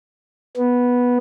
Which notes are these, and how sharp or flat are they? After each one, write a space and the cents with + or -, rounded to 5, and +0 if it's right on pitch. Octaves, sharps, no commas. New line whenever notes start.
B3 -10